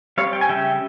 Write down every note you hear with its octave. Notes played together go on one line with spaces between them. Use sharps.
G3 C4 C#5 F5
G5
G#5
C#3 G3 C#4 E5 G5